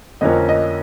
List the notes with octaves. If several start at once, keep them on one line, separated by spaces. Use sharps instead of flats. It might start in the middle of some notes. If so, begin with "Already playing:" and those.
F2 D3 F3 A#3 C#4 D#5
D#5